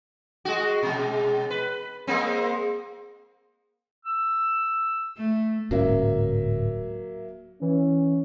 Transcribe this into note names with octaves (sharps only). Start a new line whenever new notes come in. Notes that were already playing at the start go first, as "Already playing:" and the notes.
G#3 F#4
B2 G#3
B4
G#3 A#3 C4
E6
A3
D1 G#2 F#3 A#3 C#4 E5
E3 C#4